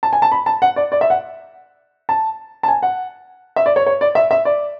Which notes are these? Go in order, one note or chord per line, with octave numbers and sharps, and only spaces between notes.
A5
G#5
A5
B5
A5
F#5
D5
D5
E5
F#5
A5
A5
G#5
F#5
E5
D5
C#5
C#5
D5
E5
E5
D5